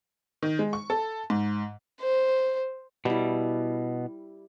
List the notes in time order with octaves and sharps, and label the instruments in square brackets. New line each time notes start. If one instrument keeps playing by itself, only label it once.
[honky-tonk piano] D#3
G#3
C#6
A4
G#2
[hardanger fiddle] C5
[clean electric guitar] B2 [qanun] G3 E4